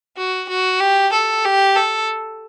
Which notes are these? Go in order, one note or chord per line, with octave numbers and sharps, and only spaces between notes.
F#4
F#4
G4
A4
G4
A4